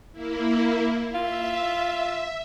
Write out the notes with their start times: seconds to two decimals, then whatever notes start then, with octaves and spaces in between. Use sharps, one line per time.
0.12 A#3 E4
1.14 F4 E5